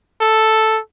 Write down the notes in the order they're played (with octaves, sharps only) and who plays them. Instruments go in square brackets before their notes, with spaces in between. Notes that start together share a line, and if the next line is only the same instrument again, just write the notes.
[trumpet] A4